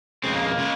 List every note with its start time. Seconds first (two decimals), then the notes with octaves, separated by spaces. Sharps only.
0.23 F2 C#3 G#3 C4
0.36 A#3
0.46 A#3
0.58 C#3 G#3